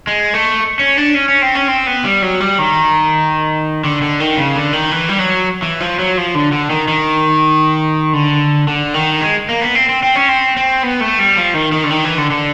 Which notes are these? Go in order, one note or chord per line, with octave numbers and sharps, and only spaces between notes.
G#3
A3
C#4
D4
C#4
C#4
C4
C#4
C4
B3
G3
F#3
G3
D#3
D3
D3
D#3
C#3
D3
D#3
E3
G3
F#3
E3
F3
F#3
F3
D3
D3
D#3
D#3
D3
D3
D#3
G#3
A#3
B3
C4
C4
C4
C#4
C4
C4
B3
A3
G3
F3
D#3
D#3
D3
D#3
E3
D3
D3